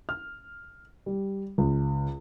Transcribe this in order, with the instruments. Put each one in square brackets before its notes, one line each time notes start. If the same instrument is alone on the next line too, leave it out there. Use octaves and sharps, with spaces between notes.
[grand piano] F6
G3
C#2